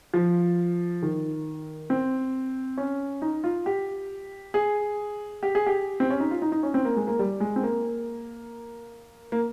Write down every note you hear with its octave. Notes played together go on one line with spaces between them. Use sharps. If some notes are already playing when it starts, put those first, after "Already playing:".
F3
D#3
C4
C#4
D#4
F4
G4
G#4
G4
G#4
G4
C4
C#4
D#4
F4
D#4
D#4
C#4
C4
A#3
G#3
A#3
G3
G#3
C4
A#3
A#3